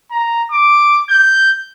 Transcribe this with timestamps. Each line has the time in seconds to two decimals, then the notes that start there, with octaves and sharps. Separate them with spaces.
0.11 A#5
0.51 D6
1.10 G6